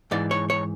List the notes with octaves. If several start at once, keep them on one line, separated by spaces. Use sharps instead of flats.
G#2 E3 D5
C#5
C#5